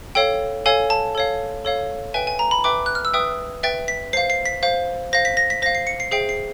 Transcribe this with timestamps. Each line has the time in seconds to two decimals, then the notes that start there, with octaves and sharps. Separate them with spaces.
0.15 A4 C#5 F5 G5
0.66 A4 C#5 F5 G#5
0.90 A5
1.15 A4 C#5 F5
1.65 A4 C#5 F5
2.14 B4 E5 G5 G#5
2.27 G#5
2.39 A#5
2.51 B5
2.64 B4 E5 G5 D6
2.86 F#6
2.95 F6
3.05 E6
3.14 B4 E5 G5 D#6
3.63 B4 E5 G5 A6
3.88 B6
4.13 C5 F5 C7
4.30 C7
4.46 B6
4.63 C5 F5
5.13 C5 F5 A#6
5.25 B6
5.37 A#6
5.50 B6
5.62 C5 F5 A#6
5.75 C7
5.87 C#7
6.00 C7
6.11 G#4 C5 E5 G5 C7
6.29 C7